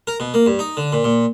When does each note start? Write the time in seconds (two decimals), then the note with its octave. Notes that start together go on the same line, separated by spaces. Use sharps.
0.07 A#4
0.20 B2
0.34 A#3
0.46 G2
0.59 D#4
0.77 D3
0.92 A#2
1.04 A#2